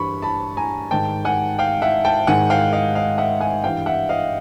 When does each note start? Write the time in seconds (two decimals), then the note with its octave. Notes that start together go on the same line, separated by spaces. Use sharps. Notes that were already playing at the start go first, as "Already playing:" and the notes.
Already playing: G2 E3 B5 C#6
0.22 A5 B5
0.57 G#5 A#5
0.91 G#2 D#3 G5 A5
1.25 F#5 G#5
1.59 F5 G5
1.82 E5 F#5
2.05 G5 A5
2.27 G#2 D#3 F#5 G#5
2.50 F5 G5
2.73 D#5 F5
2.95 D#5 F5
3.18 E5 F#5
3.41 F#5 G#5
3.64 G2 E3 F5 G5
3.86 E5 F#5
4.09 D#5 F5